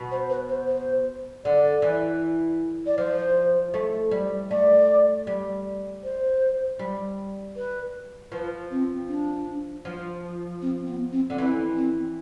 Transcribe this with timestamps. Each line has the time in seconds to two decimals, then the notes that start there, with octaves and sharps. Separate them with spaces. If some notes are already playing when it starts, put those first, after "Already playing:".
Already playing: B2
0.11 C5
0.30 B4
0.49 C5
0.68 C5
1.45 D3 D5
1.82 E3
2.87 D5
2.98 F3 C5
3.74 A3
4.11 G3
4.50 A3 D5
5.27 G3
6.04 C5
6.79 G3
7.56 B4
8.32 F3 B4
8.71 C4
9.09 D4
9.85 F3
10.62 C4
10.87 B3
11.12 C4
11.30 D3
11.38 E3 C4
11.76 C4